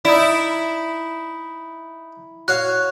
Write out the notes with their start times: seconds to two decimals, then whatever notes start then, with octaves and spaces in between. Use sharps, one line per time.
0.05 D#4 E4 D5
2.48 F#4 C#5 F5 F#6